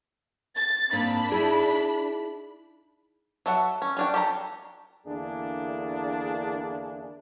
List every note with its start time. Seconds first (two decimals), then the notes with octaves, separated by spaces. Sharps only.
0.57 A6
0.93 G#2 A#3 C4 D4 B5
1.32 D#4 E4 G#4
3.46 F#3 A4 E5 F#5
3.82 C#4
3.97 C#4 D4 G5
4.14 G4 A4 A5 A#5
5.06 E2 D3 A#3 D4 E4 G#4